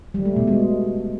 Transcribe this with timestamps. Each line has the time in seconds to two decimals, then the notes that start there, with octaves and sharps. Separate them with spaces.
0.14 G3
0.25 A3
0.36 B2
0.47 G#3